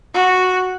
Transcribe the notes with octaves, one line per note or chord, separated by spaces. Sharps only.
F#4